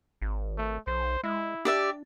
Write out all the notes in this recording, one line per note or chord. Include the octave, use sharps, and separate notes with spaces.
G#1
A3
B1 C5
G#3 E4
D4 G4 D5 E5